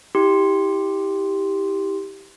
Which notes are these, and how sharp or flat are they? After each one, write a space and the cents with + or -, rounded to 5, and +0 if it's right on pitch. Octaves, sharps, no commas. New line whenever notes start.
E4 -30 G4 +0 C6 +0